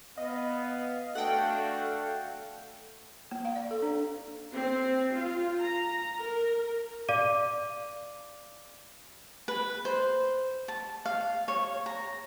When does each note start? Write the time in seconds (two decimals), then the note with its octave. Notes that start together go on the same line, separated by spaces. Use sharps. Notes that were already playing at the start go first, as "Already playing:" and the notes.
0.18 B3 D#5 F5
1.15 A3 D4 F#4 A4 F#5 G5
3.31 A#3
3.45 F5
3.56 D5
3.71 A4
3.82 D4
4.52 C4
5.13 F4
5.58 A#5
6.18 A#4
7.09 D5 F5 D6 D#7
9.48 B4
9.85 C5
10.68 A5
11.06 F5
11.48 C#5
11.86 A#5